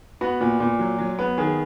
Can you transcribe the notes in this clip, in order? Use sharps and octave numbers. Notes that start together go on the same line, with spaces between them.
B3 F#4
A#2
A#2
F#3
F#3
B3
D#3 G#4